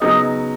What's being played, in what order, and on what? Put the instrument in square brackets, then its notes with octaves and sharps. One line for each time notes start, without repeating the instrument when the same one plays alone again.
[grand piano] C#3 F#3 B3 D#4 [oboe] D#5